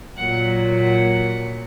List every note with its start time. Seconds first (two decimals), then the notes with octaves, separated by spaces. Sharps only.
0.17 A#2 F#3 F#5
0.79 F#5